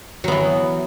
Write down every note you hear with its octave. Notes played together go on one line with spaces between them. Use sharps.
E3 F#3 B3